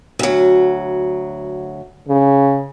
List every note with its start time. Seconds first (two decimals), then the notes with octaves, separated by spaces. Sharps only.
0.19 D2 F#3
2.09 C#3